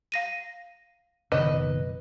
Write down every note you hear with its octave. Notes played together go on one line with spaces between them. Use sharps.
F5 A#6 D#7
F#1 B2 D#3 B4 D#5